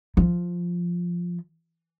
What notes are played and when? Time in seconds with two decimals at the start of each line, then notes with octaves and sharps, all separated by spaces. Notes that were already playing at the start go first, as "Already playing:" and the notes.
0.17 F3